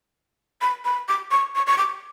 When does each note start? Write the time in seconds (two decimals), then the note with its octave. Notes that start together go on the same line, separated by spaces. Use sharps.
0.61 B5
0.84 B5
1.08 D6
1.31 C#6
1.55 C#6
1.67 C#6
1.78 D6